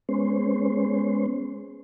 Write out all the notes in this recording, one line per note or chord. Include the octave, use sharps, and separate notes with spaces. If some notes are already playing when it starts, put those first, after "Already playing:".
G#3 B3 C#4 C5